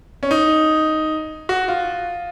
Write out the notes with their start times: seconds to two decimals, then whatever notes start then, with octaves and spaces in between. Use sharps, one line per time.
0.23 C#4
0.31 D#4
1.49 F#4
1.68 F4